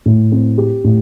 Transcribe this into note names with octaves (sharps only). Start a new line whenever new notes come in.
A2
C4
G4
A2